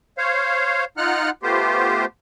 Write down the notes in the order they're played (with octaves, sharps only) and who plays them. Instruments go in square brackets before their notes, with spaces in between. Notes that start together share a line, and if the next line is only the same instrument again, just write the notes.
[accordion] C5 C#5 F5
D#4 F4 F#5 F6 F#6
A3 B3 F4 G4 C5